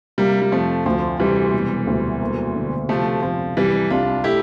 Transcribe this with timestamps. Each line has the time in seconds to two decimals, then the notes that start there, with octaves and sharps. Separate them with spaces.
0.18 C3 G3 A#3
0.42 G3
0.52 F2 F3 A3
0.86 D2 F3
1.20 C3 E3 G3
1.53 E1
1.87 D2
2.21 A#3
2.55 D3
2.89 C3 F3 A3
3.22 F2 F3
3.57 C2 E3 G3
3.90 C2 D4 F4
4.24 A3 E4 G4